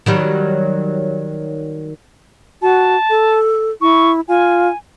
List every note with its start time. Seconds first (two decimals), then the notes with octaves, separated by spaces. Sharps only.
0.06 D#3 F#3 G3
2.62 F#4 A5
3.10 A4
3.81 E4 C#6
4.28 F4 G#5